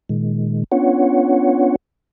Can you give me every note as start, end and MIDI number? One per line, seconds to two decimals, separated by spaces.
0.09 0.64 46
0.09 0.64 51
0.09 0.64 56
0.72 1.76 59
0.72 1.76 61
0.72 1.76 62
0.72 1.76 65
0.72 1.76 73
0.72 1.76 78